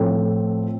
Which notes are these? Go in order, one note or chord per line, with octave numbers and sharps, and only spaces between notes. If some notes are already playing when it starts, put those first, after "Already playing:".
Already playing: A2 F3 C4 A4